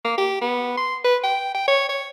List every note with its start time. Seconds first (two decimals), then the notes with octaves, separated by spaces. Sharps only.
0.05 A#3
0.18 G4
0.41 B3
0.77 C6
1.04 B4
1.23 G5
1.55 G5
1.67 C#5
1.89 C#5